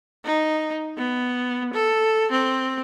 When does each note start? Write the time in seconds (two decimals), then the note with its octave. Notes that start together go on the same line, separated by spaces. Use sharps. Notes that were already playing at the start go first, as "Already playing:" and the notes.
0.24 D#4
0.97 B3
1.73 A4
2.31 C4